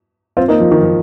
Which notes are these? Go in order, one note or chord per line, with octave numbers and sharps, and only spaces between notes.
C4 F4
A#3 D#4
F3
D#3
F3